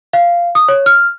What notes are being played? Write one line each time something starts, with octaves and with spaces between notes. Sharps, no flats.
F5
D#6
C#5
F6